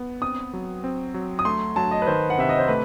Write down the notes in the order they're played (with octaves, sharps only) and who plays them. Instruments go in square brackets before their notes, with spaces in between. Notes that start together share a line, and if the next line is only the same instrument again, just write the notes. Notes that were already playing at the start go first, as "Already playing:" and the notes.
Already playing: [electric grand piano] B3
[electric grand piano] C4 [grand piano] D#6
[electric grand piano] F#3
C4
F#3
[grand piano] D#6
[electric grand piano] A3 [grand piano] C6
[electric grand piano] F#3 [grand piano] A5
[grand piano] D#5
B4
[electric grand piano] D#3 [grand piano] C5
[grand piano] F#5
[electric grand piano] C3 [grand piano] E5
[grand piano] D#5
C5
[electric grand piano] A3 [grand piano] B4